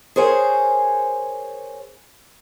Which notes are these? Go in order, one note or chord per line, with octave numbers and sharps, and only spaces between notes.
G#4 A#4 C5 C#5 G#5